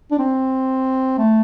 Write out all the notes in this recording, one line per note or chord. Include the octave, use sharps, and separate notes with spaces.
D4
C4
A3